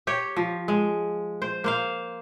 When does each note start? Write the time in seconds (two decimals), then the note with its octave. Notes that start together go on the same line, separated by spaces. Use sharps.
0.07 G4 C#5 G5
0.37 F3
0.68 G#3
1.42 C5
1.64 A#3 C5 F5